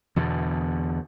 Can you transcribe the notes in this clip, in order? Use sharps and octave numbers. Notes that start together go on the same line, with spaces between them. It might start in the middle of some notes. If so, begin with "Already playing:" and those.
E2 B2 D3